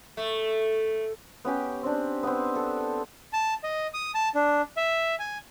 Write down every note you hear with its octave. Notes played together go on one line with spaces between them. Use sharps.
A3
B3 C#4 G4 G5
C4 D4
B3 C4
A4
A5
D#5
D#6
A5
D4
E5
G#5